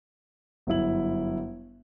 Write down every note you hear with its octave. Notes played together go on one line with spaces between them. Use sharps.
G1 F#2 E4 F#7